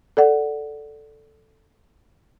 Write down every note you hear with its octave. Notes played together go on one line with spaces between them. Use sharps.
A4 D5 F#5